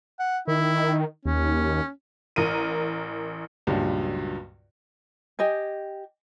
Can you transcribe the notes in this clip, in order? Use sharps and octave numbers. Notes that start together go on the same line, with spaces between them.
F#5
D#3 E4
D#2 C#4
A1 A#4 D#7
C#2 G2 A#2 F#3
G4 D#5 G5 G#5